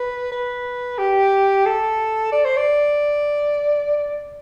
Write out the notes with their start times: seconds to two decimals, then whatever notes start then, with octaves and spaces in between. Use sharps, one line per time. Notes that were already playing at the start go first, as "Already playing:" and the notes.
Already playing: B4
0.32 B4
0.99 G4
1.66 A4
2.32 D5
2.45 C5
2.57 D5